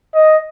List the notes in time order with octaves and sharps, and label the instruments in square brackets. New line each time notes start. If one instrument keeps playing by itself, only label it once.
[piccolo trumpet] D#5